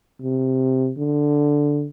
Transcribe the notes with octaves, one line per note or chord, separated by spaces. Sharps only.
C3
D3